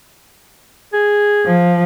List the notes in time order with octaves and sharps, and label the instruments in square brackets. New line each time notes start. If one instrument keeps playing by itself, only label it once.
[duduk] G#4
[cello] F3